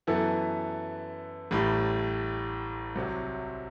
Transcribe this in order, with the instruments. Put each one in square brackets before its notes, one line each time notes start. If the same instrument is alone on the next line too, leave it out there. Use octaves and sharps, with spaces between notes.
[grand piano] F#2 E3 B3 E4 A4
A1 A2 G3
C2 C3 F#3